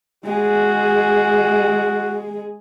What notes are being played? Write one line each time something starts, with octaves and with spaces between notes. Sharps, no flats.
G#3 F#4 G#4